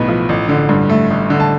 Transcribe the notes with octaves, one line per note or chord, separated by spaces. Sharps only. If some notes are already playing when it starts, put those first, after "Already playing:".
Already playing: B1 A2 B3
F3
A1
D3
G2
A3
A1
D3
A5